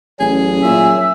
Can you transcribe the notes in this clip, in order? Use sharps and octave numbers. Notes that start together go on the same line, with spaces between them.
A1 F#3 C#4 G#4
A#2 E5